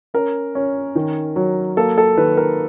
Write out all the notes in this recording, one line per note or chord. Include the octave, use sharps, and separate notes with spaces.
C#4 A#4
C#4
D#3
F#3
A#3 A4
A4
D#3 B4
A#4